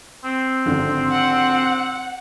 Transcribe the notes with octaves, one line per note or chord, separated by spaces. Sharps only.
C4
G#1 D3 F3
F#5